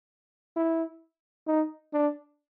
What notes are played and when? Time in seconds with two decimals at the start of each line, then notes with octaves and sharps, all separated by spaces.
0.57 E4
1.47 D#4
1.94 D4